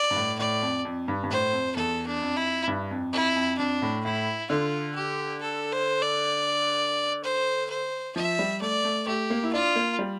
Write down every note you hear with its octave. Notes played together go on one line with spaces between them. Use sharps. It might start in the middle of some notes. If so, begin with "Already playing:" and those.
Already playing: D5
G2
A2
A2 D5
F2
F2
G2
G2
A2 C5
F2
E2 A4
D4
F2
E4
G2
F2
F2 E4
F2
F2 D4
A2
A2 E4
D3 F4
G4
A4
C5
D5
C5
C5
F3 E5
G3
A3 D5
A3
A3 G4
A#3
E4
D4 F4
A#3
G3